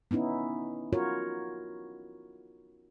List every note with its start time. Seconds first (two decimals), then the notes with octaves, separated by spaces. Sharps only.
0.11 B3 C#4 D#4 E4
0.93 F4 F#4 A#4 C#5